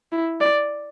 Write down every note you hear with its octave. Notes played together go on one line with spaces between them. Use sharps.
E4
D5